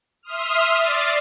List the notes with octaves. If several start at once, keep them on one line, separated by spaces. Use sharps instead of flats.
E5 C6 D#6 F6
D5 A6 C7